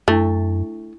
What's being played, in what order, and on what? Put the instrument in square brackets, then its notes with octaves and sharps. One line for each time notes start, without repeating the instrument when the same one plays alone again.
[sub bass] F#2 [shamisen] A3 [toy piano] D4 E4 C#6